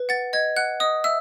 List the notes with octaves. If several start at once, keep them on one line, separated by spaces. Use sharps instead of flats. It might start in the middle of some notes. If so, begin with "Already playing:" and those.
Already playing: B4
F#5 A6
D#5 G#6
F#5 F#6
D#5 D#6
E5 E6